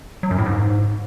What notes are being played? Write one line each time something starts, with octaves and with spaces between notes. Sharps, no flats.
F#3
F#2
A2
G#2